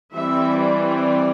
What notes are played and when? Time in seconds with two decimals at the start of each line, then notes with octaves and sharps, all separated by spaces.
0.14 E3 G3 C4 E5
0.58 D5